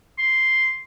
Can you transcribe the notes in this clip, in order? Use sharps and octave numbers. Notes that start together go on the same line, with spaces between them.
C6